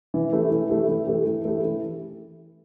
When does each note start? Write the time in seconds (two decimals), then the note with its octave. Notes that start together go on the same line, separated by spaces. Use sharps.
0.14 E3
0.33 A3 E4 G4
0.51 E3
0.70 A3 E4 G4
0.89 E3
1.07 A3 E4 G4
1.25 E3
1.45 A3 E4 G4
1.64 E3